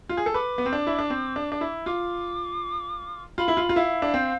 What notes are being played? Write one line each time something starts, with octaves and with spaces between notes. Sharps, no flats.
F4
G#4
A4
B4 D6
B3
C4
D4
E4
D4
C4
D4
D4
E4
F4 D6
F4 B5
E4
F4
F4
E4 F5
D4
C4